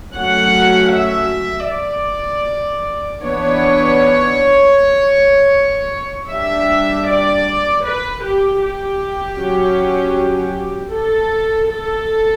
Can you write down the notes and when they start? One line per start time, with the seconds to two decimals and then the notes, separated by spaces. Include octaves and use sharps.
0.15 F#3 A3 C#4 F#5
0.93 E5
1.69 D5
3.23 E3 B3 D4 C#5
6.30 G3 D4 E5
7.08 D5
7.85 B4
8.23 G4
8.62 G4
9.39 F#3 C#4
10.92 A4
11.69 A4